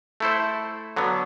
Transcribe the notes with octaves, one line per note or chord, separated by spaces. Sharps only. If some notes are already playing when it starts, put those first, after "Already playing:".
A3 E4 A4 C5
D3 F#3 B3